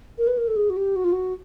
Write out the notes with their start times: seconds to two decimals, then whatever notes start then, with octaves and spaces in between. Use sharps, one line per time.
0.18 A#4
0.27 B4
0.37 A#4
0.48 A4
0.56 G#4
0.70 F#4
0.77 G4
0.96 F#4
1.04 F4
1.13 F#4